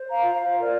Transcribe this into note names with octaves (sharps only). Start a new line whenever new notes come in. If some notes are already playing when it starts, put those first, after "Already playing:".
Already playing: C5
F5 A#5
F4
F5
A#4 D5